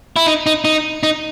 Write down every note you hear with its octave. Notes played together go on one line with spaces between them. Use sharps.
E4
D#4
D#4
D#4
D#4